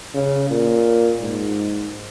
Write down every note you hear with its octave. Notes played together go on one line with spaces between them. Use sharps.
C#3
A#2
G#2